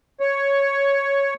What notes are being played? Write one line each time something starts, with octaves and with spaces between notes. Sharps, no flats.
C#5